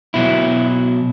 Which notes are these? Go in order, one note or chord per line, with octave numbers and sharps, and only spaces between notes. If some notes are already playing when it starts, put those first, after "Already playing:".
B2 F#3 E4